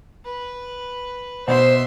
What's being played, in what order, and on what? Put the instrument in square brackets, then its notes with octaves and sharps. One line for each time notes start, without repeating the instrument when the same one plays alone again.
[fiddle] B4
[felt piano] B2 [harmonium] C5 [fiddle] E5 C6